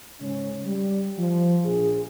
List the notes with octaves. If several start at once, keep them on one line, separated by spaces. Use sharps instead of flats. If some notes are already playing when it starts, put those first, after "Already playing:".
G#2 C#3 C#4
G3
F3
A#1 G#4